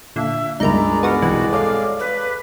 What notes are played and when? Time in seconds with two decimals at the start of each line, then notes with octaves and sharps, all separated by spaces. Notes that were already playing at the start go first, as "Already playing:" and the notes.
0.16 A#2 D3 E5
0.60 C#2 G2 G#3 D#4 A#4 D5 A#5 B5
1.03 B3 F#4 A#4
1.22 B1 C3 E3 F#4
1.52 A4 C#5 F5 D6
2.00 B4